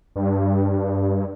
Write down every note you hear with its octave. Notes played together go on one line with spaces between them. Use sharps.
G2